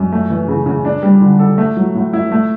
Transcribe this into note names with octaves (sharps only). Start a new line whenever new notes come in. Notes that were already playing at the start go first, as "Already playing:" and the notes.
Already playing: F#2
A3
E3
C#3
C#3
D4
G3
D3
A4
A3
F#3
A2
E4
A3